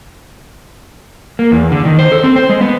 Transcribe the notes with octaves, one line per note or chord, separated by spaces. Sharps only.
A#3
E2
D3
D#3
C5
A4
C4
C5
G#3
B3